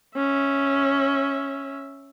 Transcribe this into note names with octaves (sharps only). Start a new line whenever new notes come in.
C#4 E5